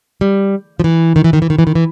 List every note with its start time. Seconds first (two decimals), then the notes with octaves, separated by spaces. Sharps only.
0.21 G3
0.80 F3
0.84 E3
1.16 D#3
1.24 E3
1.33 D#3
1.42 E3
1.50 D#3
1.59 E3
1.67 D#3
1.75 E3